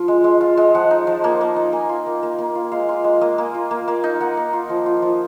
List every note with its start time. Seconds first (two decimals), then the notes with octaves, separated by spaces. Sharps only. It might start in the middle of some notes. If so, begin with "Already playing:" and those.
Already playing: F3 F4
0.08 G#3
0.24 G#3
0.41 F4
0.57 G#3
0.75 F3 F#5
0.91 D#4
1.07 F3
1.24 A#3
1.41 A#3
1.56 D#4
1.73 A#3 G#5
1.89 F4
2.06 A#3
2.23 A#3
2.38 A#3
2.55 F4
2.72 G#3 F5
2.89 F4
3.04 G#3
3.21 A#3 D#5
3.38 A#3
3.54 F4
3.71 A#3
3.88 A#3
4.04 D#4
4.21 A#3 F#5
4.37 A#3
4.53 F4
4.69 F3
4.86 F4
5.02 F3